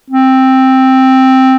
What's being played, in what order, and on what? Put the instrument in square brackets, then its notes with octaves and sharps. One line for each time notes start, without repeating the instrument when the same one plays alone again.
[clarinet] C4